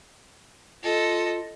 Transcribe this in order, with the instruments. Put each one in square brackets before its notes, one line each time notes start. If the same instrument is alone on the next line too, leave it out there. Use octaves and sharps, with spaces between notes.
[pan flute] F4 [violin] A4 D#5